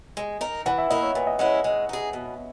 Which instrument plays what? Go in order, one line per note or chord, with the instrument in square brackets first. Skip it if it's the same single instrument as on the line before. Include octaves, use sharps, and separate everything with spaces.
[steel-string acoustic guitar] G#3
D#4 A#4
[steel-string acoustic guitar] E3 [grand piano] F#5
[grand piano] E5
[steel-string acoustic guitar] A#3 E4 [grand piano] D#5
[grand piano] C#5
[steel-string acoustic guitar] A#2 [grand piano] B4
[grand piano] D#5
[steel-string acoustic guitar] G#3 C#4 E4 [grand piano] F#5
[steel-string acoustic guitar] G#3
D#4 G#4
B2